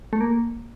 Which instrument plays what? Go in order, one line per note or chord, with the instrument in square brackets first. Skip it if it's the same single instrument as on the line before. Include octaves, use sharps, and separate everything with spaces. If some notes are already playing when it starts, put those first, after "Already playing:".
[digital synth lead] A3
A#3